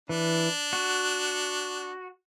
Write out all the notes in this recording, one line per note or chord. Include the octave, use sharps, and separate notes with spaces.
E3 D4
F#4